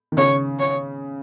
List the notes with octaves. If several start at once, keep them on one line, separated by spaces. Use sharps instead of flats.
D#3
C#3 C#5
C#5